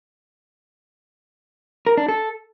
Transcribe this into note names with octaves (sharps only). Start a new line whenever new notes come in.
A#4
D4
A4